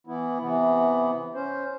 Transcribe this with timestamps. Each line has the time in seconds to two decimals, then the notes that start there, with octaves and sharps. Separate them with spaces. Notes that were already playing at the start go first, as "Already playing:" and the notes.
0.07 E3 B3 E4
0.40 C3 E3 B3
1.34 C#4 C5